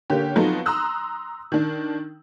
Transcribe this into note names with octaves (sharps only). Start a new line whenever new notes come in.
D3 A#3 C#4 G4
F3 F#3 B3 C4 D#4 A4
A#5 C6 D#6 E6 F#6
D#3 D4